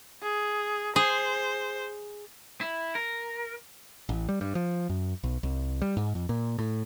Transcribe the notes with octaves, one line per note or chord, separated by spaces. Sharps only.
G#4
G#4 C5
E4
A#4
A1
G3
G2
F3
F#2
B1
C2
G3
G#2
F2
A#2
A2